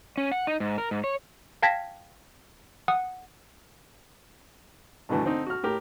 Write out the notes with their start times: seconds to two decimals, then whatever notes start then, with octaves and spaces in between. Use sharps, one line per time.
0.17 C#4
0.32 F#5
0.47 D#4
0.60 G#2
0.78 A#4
0.91 G#2
1.04 C#5
1.62 F5 G5 A5 G#6 A#6 B6
2.88 F#5 D#6
5.09 G2 B2 D3 E3 A3
5.24 D3 C4 D#4
5.47 F#4 F6
5.63 A2 G4 A#4